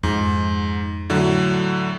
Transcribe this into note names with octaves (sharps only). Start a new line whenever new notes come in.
F2 G#2
A2 D3 F#3